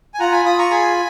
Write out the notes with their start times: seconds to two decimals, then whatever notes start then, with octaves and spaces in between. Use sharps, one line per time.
0.14 G#5
0.19 F4 F#5 A#5
0.32 G#5 B5
0.45 F4 B5 D#6
0.58 A#5 C#6
0.70 G#4 G#5 B5